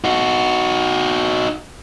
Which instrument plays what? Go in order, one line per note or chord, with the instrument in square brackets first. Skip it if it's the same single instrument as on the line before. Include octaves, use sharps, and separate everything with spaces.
[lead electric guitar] D#4 F#4